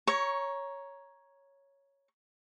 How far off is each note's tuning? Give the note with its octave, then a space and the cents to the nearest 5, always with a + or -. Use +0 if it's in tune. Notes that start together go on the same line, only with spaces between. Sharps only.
C#5 +0 A#5 +15 C#6 +20